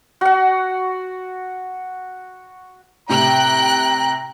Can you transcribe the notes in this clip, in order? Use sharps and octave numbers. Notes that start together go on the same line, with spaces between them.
F#4 F#5
A2 C3 G5 A#5 F#6